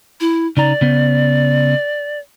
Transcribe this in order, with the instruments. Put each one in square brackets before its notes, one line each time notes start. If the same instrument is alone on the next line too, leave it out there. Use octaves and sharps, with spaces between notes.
[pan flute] E4
[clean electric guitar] C#3 D#4 A#5 [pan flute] D5
[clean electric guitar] C#3 B3 C5